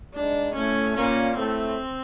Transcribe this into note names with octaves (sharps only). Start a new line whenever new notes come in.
G#2 G#3 D4
A2 A3 C#4
A#2 A#3 C#4
A2 A3 C4